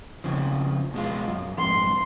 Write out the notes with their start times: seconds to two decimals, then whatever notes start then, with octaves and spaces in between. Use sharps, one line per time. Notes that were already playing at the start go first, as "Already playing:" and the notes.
0.24 F2 C#3 F3
0.94 B2 G#3 F4
1.28 F#2
1.58 F2 G#2 C6